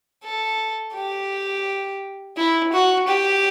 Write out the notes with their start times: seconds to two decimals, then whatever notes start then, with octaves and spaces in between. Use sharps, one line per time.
0.24 A4
0.95 G4
2.37 E4
2.73 F#4
3.08 G4